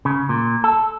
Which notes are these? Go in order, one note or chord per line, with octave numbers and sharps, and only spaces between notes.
C#3
A#2
A4